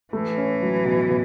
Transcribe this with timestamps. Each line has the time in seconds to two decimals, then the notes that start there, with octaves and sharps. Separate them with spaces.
0.13 E3 A3
0.38 C#4
0.62 F#3
0.85 B2
1.10 B2